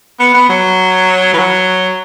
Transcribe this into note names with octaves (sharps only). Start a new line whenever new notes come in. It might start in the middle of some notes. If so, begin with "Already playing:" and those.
B3
B3
F#3
E3
F#3